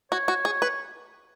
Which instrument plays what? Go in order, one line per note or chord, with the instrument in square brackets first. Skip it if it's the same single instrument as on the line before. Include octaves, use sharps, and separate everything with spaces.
[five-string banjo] F#4 [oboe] C#5
[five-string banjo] F#4
G#4
B4